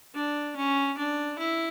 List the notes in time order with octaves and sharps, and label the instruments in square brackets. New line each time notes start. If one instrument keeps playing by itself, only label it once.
[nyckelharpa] D4
C#4
D4
E4